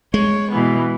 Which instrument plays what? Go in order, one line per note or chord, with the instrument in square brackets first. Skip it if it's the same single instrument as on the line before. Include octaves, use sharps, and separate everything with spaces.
[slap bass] G#3 [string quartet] C#5
[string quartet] B2 E3 B3